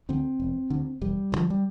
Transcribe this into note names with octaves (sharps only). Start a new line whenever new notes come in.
D2 D3 C4
E1
D2 D3
E1 G3
D2 D3 F3
G3